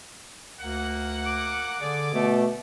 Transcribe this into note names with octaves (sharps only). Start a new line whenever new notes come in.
D2 A#3 F#5
D6
D3 G#4 D5
B2 A3